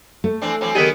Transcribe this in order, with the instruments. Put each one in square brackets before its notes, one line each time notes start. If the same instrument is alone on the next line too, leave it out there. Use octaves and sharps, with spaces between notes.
[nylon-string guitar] A3
[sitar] E3 C4 D4
E3 F#3 C4
[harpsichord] D#3 B3 D#4 [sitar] F#3 G#4 [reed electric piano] G4